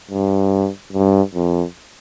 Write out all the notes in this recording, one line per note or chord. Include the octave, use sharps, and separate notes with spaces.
G2
G2
F2